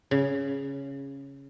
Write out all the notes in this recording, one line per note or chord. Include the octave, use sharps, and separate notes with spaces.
C#3